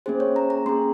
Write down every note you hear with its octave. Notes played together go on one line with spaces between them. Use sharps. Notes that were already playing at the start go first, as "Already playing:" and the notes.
A#3 C#4 G#4 C5
C#5
A#5
A#5
A#3 C#4 G#4 C6